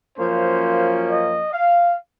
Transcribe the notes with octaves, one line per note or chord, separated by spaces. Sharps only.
F#2 F3 A#3 C#4 C5
D#5
F5